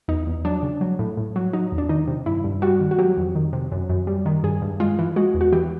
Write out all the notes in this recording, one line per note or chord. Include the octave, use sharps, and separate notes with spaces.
E2 D#4
E2
F#3 D4
C#3
F#3
A2
A2
F#3
F#3 D#4
E2
D4
D#3 D#4
C3
G2 E4
G2
G3 F#4
D#3
F#4
F#3 G4
F2
D#3
C3
F#2
F#2
G3
D#3
G2 G#4
G2
G#3 F4
E3
G#3 F#4
E2
F#4
E3 G4